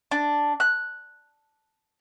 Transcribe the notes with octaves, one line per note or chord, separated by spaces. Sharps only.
D4
F#6